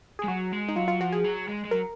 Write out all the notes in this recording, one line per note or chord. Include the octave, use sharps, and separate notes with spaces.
G#4
G#3
F#3 F#4
G#3
D#4
F#3 F4
F4
F3 F#4
G#4
F#3
G#3
G#3
F#3 A#4